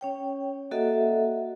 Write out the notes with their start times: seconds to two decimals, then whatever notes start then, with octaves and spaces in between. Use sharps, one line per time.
0.01 C#4 C#5 G5
0.71 A#3 F#4 A4 D#5 E5 F#5